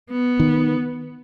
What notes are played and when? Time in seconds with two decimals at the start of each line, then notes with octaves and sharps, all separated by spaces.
0.11 B3
0.40 D#3